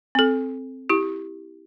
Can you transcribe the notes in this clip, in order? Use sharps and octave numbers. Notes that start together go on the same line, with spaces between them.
C4 A4
E4 G4